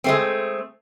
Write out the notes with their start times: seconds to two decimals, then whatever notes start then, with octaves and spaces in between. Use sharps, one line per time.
0.04 G#3 A3 C4